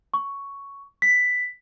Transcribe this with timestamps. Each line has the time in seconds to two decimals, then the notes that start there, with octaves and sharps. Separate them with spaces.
0.14 C#6
1.02 B6